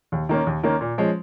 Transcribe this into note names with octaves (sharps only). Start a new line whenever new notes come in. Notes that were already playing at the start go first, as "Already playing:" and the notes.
D#2
D#3 A#3 C#4
D#2
D#3 A#3 C#4
A#2
F3 G#3 C#4